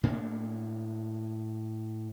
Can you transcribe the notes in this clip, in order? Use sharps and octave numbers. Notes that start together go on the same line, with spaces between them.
A2 A#3 D4